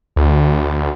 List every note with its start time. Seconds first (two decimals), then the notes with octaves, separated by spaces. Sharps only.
0.16 D2